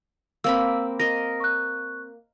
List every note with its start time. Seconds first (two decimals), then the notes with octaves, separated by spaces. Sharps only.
0.44 A#3 C4 B5 E6
1.00 A#4 D#5 A#6
1.40 C#6 F#6